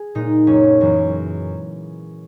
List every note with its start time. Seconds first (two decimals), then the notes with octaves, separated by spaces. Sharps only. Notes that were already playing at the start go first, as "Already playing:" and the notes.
Already playing: G#4
0.15 A#2 G#3 D#4
0.47 F#1 C#4
0.81 F#2 E3 G#3